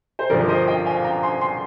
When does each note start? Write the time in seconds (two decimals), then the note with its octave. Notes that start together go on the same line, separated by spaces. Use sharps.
0.19 C5
0.30 G#1 G2 D3 F3 A#4 D5
0.48 C5 D#5
0.67 D#5 G5
0.85 F5 G#5
1.04 G5 A#5
1.23 G#5 C6
1.41 G#5 C6